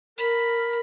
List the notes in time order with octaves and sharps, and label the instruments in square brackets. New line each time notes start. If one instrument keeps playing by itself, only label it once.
[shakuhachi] A#4 [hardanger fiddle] B5